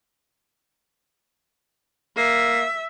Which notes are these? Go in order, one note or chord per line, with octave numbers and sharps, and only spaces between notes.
A#3 E5